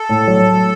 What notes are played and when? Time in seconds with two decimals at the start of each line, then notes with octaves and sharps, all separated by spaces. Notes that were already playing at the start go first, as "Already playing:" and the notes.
Already playing: A4
0.09 A2
0.28 F#3